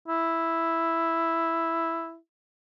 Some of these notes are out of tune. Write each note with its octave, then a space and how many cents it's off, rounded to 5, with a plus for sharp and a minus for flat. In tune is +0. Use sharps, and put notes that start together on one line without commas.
E4 +0